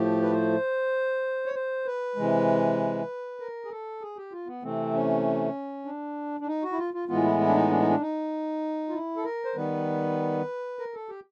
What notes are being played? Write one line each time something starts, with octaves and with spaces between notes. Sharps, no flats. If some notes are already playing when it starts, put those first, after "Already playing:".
Already playing: A2 F3 A3 G4
B4
C5
C#5
C5
B4
C3 E3 G#3
A#4
G#4
A4
G#4
G4
F4
B3
C3 E3 A3 C4
C#4
D4
D4
D#4
F#4
E4
F4
F4
A2 E3 G#3 B3 F4
E4
E4
D4
D#4
D4
D#4
D4
D#4
F4
E4
A4
A#4
C5
D#3 G3 B3 B4
A#4
A4
G4